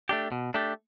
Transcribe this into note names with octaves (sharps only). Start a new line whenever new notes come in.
A3 D4 G4
B2
A3 D4 G4